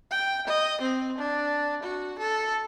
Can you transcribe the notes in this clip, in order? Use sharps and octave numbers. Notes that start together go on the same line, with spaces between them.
G5
D#5
C4
D4
F#4
A4